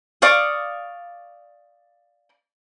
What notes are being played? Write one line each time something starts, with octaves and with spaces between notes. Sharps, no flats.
D5 F5 C#6 D#6